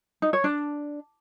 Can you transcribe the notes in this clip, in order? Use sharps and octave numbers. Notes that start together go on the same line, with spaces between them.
D#4
C#5
D4